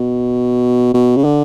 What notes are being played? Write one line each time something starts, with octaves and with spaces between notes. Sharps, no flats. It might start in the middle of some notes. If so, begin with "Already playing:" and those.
Already playing: B2
B2
C#3
D3